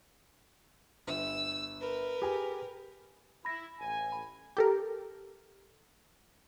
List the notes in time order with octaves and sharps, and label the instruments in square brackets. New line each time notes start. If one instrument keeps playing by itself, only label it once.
[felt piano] G1 [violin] E6
[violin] A#4 B4
[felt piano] G4 G#4 G#5
[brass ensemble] E4 [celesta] B5 A#6
[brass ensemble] A1 G#5
[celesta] B5
[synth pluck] G4 A4 A#4